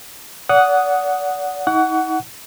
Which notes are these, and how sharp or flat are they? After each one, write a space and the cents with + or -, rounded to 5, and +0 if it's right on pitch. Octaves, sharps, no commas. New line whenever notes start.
D5 -35 F#5 +0 D#6 +0
D#4 +40 F#5 +10 C#6 +35